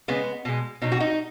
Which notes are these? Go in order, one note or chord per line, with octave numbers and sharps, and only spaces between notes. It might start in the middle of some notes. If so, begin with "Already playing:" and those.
C#3 G#3 B3
B2 G#3
B2 F#3 D#4
F#4
D#4